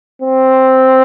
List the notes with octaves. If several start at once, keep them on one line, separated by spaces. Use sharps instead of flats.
C4